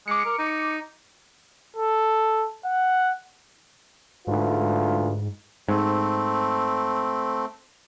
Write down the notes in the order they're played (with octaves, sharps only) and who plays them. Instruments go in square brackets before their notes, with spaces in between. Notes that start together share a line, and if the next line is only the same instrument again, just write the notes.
[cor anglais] G#3 [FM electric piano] D6 C#7
[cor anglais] A#4
D#4
[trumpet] A4
F#5
[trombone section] D2 F4 B4 [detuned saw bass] G#2
[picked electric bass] G#2 [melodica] A3 C4